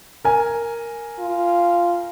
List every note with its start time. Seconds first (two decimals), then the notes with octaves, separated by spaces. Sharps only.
0.25 A#4 G#5
1.19 F4